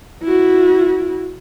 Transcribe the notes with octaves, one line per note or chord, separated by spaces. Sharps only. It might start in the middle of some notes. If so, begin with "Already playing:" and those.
E4 F#4